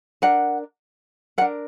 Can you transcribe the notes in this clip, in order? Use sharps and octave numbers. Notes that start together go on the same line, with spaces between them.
D4 A#4 F#5
D4 A#4 F#5